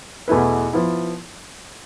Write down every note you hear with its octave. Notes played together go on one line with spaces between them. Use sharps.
E2 B2 A3 E4 B4
F3 B3 E4